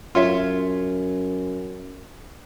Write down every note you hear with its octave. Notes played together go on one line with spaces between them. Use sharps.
F#2 F4 C#5 E5